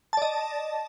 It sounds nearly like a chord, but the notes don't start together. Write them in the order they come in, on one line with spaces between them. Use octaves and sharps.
A5 D5 D#5